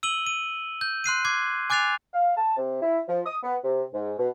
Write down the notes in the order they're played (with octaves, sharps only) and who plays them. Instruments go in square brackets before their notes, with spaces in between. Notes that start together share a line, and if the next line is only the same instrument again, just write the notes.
[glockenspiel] E6 D#7 F#7 G7
D#7
G6
C6 F#6 C7 D#7
D6 G#6 C7
G#5 D6 F#6 A6 C7 F7
[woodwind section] F5
A5
C3
E4
F3
D#6
B3
C3
G#2
B2